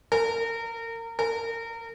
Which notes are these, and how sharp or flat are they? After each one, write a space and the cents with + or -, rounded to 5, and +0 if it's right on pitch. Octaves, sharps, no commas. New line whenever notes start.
A#4 -30
A#4 -30